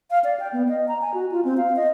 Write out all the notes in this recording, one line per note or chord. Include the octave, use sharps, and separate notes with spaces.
F5
D5
G5
B3
D#5
A#5
G#5
F#4
F4
C4
F5
D#5